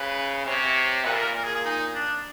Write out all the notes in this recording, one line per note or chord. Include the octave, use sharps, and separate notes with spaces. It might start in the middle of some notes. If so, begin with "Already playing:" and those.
Already playing: C#3 B4
C3 C#5
A#2 B4
A4
A#4
A#2 A#4
G#4
G#4
D#4
D4